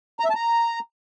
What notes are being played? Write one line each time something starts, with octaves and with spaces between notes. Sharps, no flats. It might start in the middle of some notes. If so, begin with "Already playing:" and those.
A#5
E5
A5
A#5